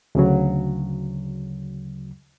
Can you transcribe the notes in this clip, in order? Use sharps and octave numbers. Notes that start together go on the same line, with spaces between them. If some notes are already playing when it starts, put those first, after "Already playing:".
D2 C#3 F#3